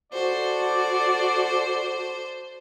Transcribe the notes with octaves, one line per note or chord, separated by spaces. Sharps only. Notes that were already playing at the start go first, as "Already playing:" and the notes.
F#4 A4 C5 D5